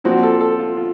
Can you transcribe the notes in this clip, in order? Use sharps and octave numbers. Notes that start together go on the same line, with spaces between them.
A#2 F3 C4 F#4
A4
A4
F4
F4